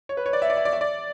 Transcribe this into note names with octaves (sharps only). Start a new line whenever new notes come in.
C#5
B4
C#5
D5
E5
D5
E5
D5
E5
D5